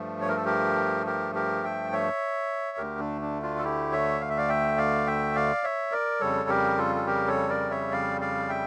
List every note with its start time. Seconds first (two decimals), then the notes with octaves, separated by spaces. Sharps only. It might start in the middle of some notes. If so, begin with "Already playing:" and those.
Already playing: G2 F3 A3
0.21 C#5
0.29 A#4
0.37 A4
0.46 G4 A#4
1.06 G4 A#4
1.35 G4 A#4
1.64 E5 G5
1.92 C#5 E5
2.77 D2 D3 A3 G4 A#4
2.99 D4
3.21 D4
3.42 D4 F4
3.58 A4
3.63 E4 G4
3.92 C#5 E5
4.21 F5
4.29 E5
4.37 D5 F5
4.49 E5 G5
4.77 D5 F5
5.06 E5 G5
5.36 D5 F5
5.64 C#5 E5
5.92 A#4 D5
6.20 F2 C#3 G3 A4 C#5
6.49 G4 A#4
6.78 F4 A4
6.95 A4
7.07 G4 A#4
7.27 A4 C#5
7.49 A#4 D5
7.71 C#5 E5
7.92 D5 F5
8.21 D5 F5
8.49 E5 G5